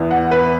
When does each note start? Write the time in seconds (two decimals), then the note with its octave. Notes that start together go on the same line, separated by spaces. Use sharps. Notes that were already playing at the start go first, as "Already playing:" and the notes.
Already playing: E2 E3 B3
0.11 F#5
0.31 B4